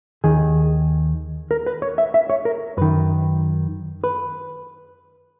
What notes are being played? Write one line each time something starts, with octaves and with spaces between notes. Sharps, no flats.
D#2 D#3 G#4
A#4
B4
C#5
E5
E5
C#5
A#4
F#2 D#3 B4
B4